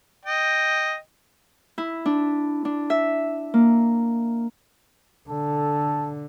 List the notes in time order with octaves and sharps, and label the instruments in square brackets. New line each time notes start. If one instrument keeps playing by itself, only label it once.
[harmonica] D#5 G5
[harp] E4
D4
D4
E5
A#3
[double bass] D3 [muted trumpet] A4